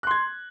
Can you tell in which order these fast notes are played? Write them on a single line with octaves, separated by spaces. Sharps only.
F#6 C6 G#6